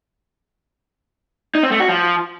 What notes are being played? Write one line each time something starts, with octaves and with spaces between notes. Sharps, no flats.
D#4
C4
A3
F#4
F3